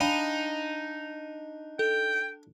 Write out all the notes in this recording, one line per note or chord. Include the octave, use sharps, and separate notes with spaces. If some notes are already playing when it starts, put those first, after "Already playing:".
D4 D#4 F5 G5 B5
A4 G5